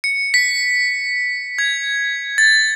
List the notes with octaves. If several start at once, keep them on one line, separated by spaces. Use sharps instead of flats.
C#7
B6
G#6
A6